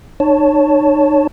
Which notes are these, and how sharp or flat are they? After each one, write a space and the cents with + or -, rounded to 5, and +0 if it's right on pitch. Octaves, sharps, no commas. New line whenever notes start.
D#4 -40 C#5 +5 A5 +0